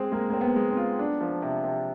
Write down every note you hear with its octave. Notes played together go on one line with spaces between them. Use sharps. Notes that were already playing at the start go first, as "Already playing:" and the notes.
Already playing: G#3 C4 G#4
G#3 A#3
A#3 C4
B3
G#3
C4
F4
D4
F3
C3
C3